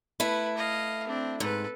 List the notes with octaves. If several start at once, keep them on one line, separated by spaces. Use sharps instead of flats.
A3 E4 B4
D#5 F5
C4 D4
G#2 A4 B4